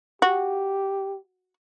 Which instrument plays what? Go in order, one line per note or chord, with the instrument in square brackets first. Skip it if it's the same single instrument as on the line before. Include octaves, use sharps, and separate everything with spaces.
[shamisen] F#4 [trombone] G4